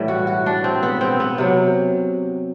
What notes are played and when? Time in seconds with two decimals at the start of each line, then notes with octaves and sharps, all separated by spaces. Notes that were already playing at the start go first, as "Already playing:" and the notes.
Already playing: A2 E3 G3
0.08 F#4
0.27 F#4
0.46 D4
0.64 C4
0.83 B3
1.01 C4
1.20 B3
1.38 C3 F#3